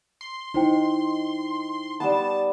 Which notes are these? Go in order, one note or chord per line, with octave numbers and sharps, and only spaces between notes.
C6
D#4 E4 C5 G5
G3 B3 A5